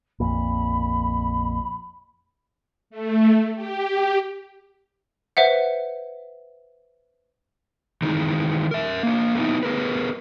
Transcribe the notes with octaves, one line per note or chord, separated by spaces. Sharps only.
A#1 F2 A#2 B5
A3
G4
B4 C5 E5 F#5
D#3 E3 G#3 D#4
A#4 E5
A#3 D4
A3 B3 C#4 D#4 E4
B3 G#4 A#4 B4